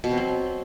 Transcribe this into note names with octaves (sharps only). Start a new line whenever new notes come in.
B2
C4
F#3